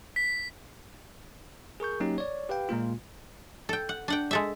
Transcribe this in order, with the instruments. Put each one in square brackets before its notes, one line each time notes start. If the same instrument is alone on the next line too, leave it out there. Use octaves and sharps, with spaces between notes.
[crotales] B6
[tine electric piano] G#4 A#4 C#6 G6
F#3 A#3 C#4 D#4 G4
C#5 D5
G4 B4 F5 G5
A#2 G#3 A#3 F4
[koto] A4 G5
F#5
D4 F#5 G5
G#3 A4 E5